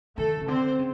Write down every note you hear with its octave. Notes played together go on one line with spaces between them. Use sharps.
D#3 A3 A4
C#3
D3 C4 C5
C#3